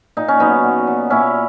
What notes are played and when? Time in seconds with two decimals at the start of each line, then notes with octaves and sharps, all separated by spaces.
0.17 A#2 D#4
0.28 C#4
0.40 F#3 B3 D#4
0.63 A#2
0.87 F#3
1.10 A#2 C#4 E4